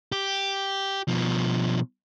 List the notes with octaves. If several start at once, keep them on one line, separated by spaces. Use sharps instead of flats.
G4
B2 F3